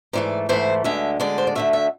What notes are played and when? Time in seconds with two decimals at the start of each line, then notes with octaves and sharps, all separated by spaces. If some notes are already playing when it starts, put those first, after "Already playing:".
0.13 G#2 E3 A3 D5
0.49 G#2 E3 A3 C5
0.84 D2 D3 G#3 E5
1.20 D2 D3 G#3 D5
1.38 C5
1.47 D5
1.55 D2 D3 A3 E5
1.73 E5